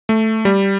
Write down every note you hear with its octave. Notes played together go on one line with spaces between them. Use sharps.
A3
G3